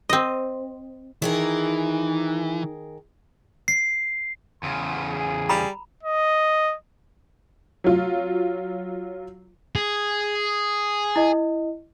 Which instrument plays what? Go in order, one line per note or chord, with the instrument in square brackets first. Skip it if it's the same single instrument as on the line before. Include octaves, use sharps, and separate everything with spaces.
[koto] C4 D#5
[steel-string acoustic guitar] D#3 G#4 A#4 [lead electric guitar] E3 [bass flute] D#4
[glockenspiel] C7
[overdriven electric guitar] E2 C#3 [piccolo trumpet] C6
[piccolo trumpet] G#4
[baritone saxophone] G3 [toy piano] A#5 B5
[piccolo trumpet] D#5
[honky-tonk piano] F#3 F4
[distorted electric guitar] G#4
[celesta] E4 D#5